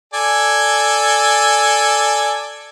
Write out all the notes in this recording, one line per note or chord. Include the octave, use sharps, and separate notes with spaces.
A4 D5 G#5